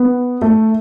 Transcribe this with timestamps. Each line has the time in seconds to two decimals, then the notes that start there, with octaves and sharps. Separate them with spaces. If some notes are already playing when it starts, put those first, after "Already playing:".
Already playing: B3
0.42 A3